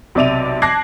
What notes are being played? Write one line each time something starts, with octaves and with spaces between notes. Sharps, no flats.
B1 C3 D5 E5 D#7 F7
A5 D6 F#6 G#6 A#6 C7